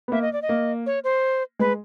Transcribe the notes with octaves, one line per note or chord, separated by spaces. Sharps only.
B3
A#3 E5
D#5
D5
D#5
A#3
C#5
C5
G#3 B4